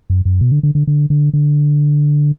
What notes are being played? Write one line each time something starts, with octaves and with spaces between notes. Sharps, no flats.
F#2
F#2
B2
D3
D3
D3
D3
D3
D3